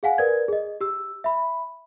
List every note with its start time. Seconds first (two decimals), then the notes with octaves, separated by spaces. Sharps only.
0.03 G#4 F5 F#5 G#5
0.18 A#4 B4 D5 G#6
0.48 G#4 D#5
0.81 G4 E6
1.24 E5 B5